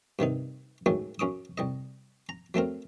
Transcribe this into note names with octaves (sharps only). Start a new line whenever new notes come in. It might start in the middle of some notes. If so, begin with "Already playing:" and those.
G2 C3 D#3 D#4
F#2 A2 D#3 F#3 G#3
F#2 C#4 D6 D#6
C2 G3 D#5
A#5
F#3 A3 C4 A#4